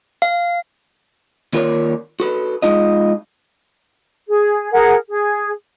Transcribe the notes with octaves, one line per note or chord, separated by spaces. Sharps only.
F5
D#2 F4 A#4 C#5 D5
F#4 A4 B4
G#3 D#4 F4 D#5
G#4
G#4 A#4 F#5
G#4